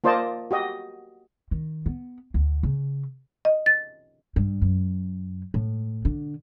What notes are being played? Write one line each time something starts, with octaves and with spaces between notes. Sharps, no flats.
A#3 F4 C5 D5 D#5 A5
F#4 G4 D#5
D#3
B3
D2
C#3
D#5
A6
G2
F#2
A2
D3